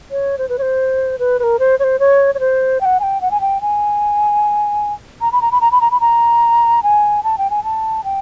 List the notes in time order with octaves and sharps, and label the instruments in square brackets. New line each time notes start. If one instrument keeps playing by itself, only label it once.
[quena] C#5
C5
B4
C#5
C5
B4
B4
A#4
C5
C#5
C5
C#5
C#5
C5
G5
F#5
G#5
G5
F#5
G#5
G5
G#5
A#5
B5
A#5
B5
A#5
B5
A#5
B5
A#5
G#5
A5
G5
G#5
A5
G5